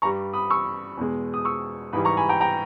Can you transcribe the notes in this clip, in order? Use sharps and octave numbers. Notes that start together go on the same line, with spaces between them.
G2 G3 A#5 C#6
B5 D#6
C#6 E6
E2 B2 G#3
D#6
C#6 E6
G#2 E3 G3 B5 D#6
A#5 C#6
G#5 B5
G5 A#5
G5 A#5